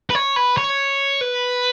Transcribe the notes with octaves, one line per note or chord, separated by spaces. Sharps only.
B4
C#5
B4
C#5
B4